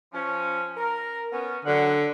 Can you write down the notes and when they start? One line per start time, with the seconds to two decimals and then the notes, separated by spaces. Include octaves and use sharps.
0.13 F3 C#4
0.76 A#4
1.32 B3 C#4
1.65 D3 F#3 F#5